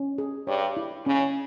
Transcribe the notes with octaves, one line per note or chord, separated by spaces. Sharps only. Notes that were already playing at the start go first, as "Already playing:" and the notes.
Already playing: C#4
G#4
G2 C#5
E4
C#3 C#4